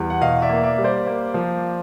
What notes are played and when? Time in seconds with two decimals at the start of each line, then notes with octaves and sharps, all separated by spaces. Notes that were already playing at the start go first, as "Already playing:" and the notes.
Already playing: E2 G3
0.10 F#5
0.21 B2 D#5 F5
0.42 D5 E5
0.49 A#3
0.64 D5 E5
0.78 G3
0.84 C5 D5
1.07 A#3
1.34 F3